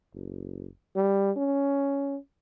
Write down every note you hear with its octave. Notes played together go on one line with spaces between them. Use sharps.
F#1
G3
C#4